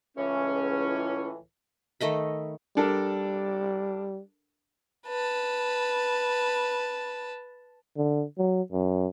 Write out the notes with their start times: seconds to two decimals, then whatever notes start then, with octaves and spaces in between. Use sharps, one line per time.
0.17 C#2 A2 E3 C#4
2.00 D#3 A3 D#5 B5
2.77 G3 D4 A4 A#4
5.06 B4 A5
7.97 D3
8.38 F#3
8.72 F#2